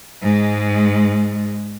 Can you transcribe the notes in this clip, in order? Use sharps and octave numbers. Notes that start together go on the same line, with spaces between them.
G#2 G#3